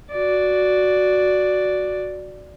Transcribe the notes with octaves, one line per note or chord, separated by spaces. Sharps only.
F#4 D5